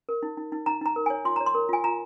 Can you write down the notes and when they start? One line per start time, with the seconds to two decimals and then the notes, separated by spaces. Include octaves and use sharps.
0.09 A#4
0.23 D#4
0.37 D#4
0.52 D#4
0.66 D#4 A#5
0.81 D#4 A#5
0.96 A#4
1.06 C#5 G#5
1.25 F4 C6
1.36 C#5 A#5
1.46 C6
1.55 A#4
1.69 F4 G#5
1.84 F4 A#5